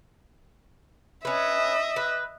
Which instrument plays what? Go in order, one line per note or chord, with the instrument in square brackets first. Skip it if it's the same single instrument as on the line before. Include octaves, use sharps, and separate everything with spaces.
[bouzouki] C#4 B4 [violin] D#5 E5
[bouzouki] B4